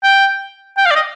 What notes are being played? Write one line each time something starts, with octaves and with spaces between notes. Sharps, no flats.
G5
G5
F5
D5
D#5